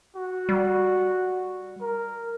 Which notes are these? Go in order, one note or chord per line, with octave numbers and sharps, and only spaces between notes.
F#4
G3
A#4